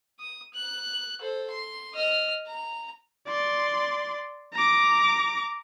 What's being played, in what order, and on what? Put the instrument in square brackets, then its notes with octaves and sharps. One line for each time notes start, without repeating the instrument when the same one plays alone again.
[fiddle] D#6
F#6
A4 C5
C6
D#5 F6
A#5
[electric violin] D5 C6
A#5 D6